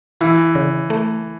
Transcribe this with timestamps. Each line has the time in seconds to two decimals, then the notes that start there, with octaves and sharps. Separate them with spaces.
0.21 E3 E4
0.55 C#3
0.90 A3